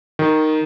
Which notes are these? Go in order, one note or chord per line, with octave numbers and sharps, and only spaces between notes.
D#3